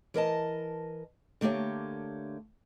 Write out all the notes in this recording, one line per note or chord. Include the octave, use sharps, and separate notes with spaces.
E3 A#4 D#5 A5
D3 A3 A#3 G4 C#5